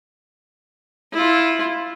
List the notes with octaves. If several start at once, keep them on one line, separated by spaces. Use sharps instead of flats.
E4 F4